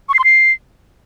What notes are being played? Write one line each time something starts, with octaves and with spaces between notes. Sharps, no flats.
C#6
C7
C6
C7